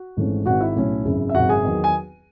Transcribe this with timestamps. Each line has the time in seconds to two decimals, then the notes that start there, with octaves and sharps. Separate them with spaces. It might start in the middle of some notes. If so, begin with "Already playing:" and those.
Already playing: F#4
0.17 G#1 G#2 E3 A3 C#4
0.46 G#1 G#2 D#3 F#4 F#5
0.61 E4 E5
0.76 B1 A2 F#3 C#4
1.05 G#1 F#2 C#3
1.29 E5
1.34 G#1 F#2 C#3 F#4 F#5
1.49 G#4 G#5
1.63 E2 D#3 F#3
1.84 G#5